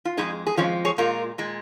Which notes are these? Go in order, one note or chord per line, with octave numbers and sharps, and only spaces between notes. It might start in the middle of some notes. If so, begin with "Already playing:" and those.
F4
F2 F3 G#3 D#4 G#4
G#4
F2 F3 G#3 C#4 F4
G#4 C#5
A#2 G#3 F4 A#4
A#2 G#3